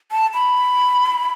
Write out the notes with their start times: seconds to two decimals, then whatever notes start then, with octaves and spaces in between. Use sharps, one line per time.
0.12 A5
0.34 B5